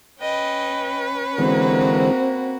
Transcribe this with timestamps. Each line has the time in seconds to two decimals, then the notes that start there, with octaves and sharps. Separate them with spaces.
0.20 C#4 B4 D#5 G5
1.38 D3 E3 G#3 A#3 C4 F#4